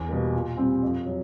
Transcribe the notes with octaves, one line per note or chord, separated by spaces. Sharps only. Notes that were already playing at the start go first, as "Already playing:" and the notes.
Already playing: E2
B2 G3 A#3
A#2
G3 C4
F2
F#3